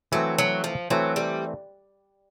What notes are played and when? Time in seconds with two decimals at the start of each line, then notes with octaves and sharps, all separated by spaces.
0.12 E3 F#3 A3 C4
0.38 F#3
0.64 F3
0.90 E3 F#3 A3 C4
1.16 G3